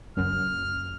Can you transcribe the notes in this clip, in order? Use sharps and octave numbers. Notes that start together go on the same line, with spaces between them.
F#1 C#2 F#2 F6